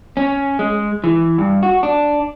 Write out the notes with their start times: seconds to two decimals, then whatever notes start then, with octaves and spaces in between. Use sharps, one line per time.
0.17 C#4
0.59 G#3
1.04 E3
1.38 G2
1.63 F#4
1.83 D4